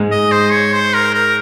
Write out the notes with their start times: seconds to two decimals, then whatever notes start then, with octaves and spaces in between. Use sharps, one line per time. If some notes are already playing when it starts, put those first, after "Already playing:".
Already playing: G#2 G#3
0.12 D#5
0.32 C5
0.52 C#5
0.73 C5
0.94 A#4
1.14 A#4